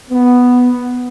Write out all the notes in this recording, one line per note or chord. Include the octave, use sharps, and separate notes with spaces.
B3